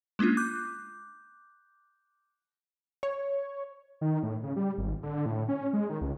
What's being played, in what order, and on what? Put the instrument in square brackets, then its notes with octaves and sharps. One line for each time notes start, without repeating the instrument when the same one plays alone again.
[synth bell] G#3 A#3 C#4 D4 F4
D6 F#6 G6
[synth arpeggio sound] C#5
[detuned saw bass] D#3
A2
C#3
G3
G#1
D3
A2
C#4
G#3
D#3
C#2